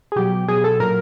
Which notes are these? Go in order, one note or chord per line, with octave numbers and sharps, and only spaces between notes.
G#4
B2 F#3 G4
B2 F#3 G#4
A4
A#2 F#3 A#4